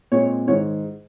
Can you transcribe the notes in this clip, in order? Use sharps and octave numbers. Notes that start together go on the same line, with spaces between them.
A#2 G#3 C4 C#5
G#2 D#3 G#3 C#5